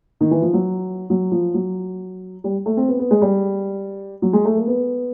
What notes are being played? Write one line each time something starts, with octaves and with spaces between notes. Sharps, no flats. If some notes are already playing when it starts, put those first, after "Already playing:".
D#3
E3
F3
F#3
F#3
F3
F#3
G3
A3
C4
B3
B3
G#3
G3
F#3
G#3
A3
A#3
B3